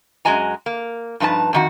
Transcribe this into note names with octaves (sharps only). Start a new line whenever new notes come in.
F#2 G#3 F#4 D#5 G#5 A#5
A#3
G2 F3 D#4 B4 A5
F2 D#3 F#4